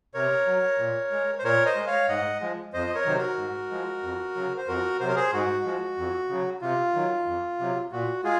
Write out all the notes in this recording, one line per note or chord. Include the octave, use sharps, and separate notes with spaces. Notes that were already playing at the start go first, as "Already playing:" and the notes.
C3 A#4 C#5
F#3
A#2
G#3
C5
A#2 A#4 C#5
C5 D#5
G#3
C#5 F5
G#2 D#5 F#5
F3 G#3
F2 C5 D#5
D#5
A#4 C#5
C3 D#3 F#3 C5
F#4 A#4
G#2
F3 G#3
F2
C#3 F#3
C5
F2 F#4 A#4
C3 F#3 C5
A#4
G#4 C5
G#2 F#4
F3 G#3
F2
C#3 F#3
C3 F4
D#3 F#3
F2
C3 F#3
A#2 F#4
G#3 F4 G#4